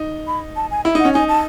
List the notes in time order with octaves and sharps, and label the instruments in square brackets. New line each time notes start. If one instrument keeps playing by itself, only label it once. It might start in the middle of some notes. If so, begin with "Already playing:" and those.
Already playing: [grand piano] D#4
[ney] B5
A5
G#5
[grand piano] E4 [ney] E5
[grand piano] D#4 [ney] F#5
[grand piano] C#4
[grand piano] D#4 [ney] G#5
[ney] A5